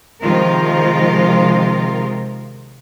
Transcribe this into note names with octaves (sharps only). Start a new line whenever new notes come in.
C3 D#3 F3 G#3 F4 A#4